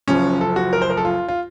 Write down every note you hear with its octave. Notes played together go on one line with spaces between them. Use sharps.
F#1 F#2 F3 C#4
A4
F#4
A#4
C5
A#4
A4
F4
F4